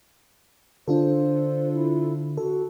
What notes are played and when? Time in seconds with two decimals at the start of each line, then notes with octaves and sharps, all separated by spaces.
0.88 D3 D4 F4 A4 C5
1.74 E4
2.37 F#4 A4